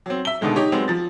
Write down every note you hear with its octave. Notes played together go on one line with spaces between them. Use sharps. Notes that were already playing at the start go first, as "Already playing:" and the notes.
F#3 C4
E5 G7
B2 D3 D#3 G#3 A3
D#4 G4 C#5
F#3 G#3 B3 C4
F3 A6